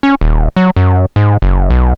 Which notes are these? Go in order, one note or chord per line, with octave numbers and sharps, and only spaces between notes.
C#4
D#1
F#3
F#2
G#2
F#1
B1